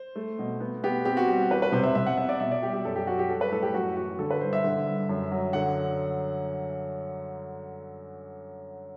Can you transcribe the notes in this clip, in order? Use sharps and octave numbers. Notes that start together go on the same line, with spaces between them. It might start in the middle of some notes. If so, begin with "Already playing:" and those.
Already playing: C5
A3
B2
B3
B3 G4
C4 G4
F#4
G3
E2 B4
B4
C3 C5
E5
C3 E5
F#5
B3 E5
D5
B2 E5
D5
G3 G4
G4
F#2 A4
G4
F#3 F#4
G4
G3 A4
B4
A2 A4
G4
F#2 F#4
E3 F#4
D3 A4
B4
G2 C5
E5
D3
G2
F#2
F#3
D3 F#5